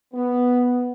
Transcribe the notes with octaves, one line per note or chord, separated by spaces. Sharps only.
B3